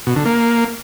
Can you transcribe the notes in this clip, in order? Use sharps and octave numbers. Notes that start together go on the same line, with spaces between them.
B2
D3
A#3